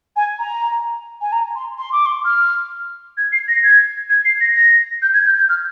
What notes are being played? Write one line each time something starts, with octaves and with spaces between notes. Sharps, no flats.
G#5
A#5
G#5
A#5
C6
C6
D6
C6
F6
G#6
C7
A#6
G#6
G#6
C7
A#6
A#6
G6
G#6
G6
G6
F6